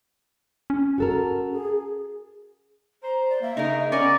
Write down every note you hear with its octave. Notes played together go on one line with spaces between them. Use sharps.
C#4
F#4 A4 A#4
G#4
C5 A#5
D5
A#3 E5
C#3 D#4 A#4
B3 C#4 A#4 D5 G#5